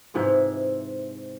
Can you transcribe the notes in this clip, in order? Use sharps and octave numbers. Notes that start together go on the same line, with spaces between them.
G#2 C3 E3 F4